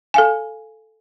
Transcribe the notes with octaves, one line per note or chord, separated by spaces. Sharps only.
A4 F5 G#5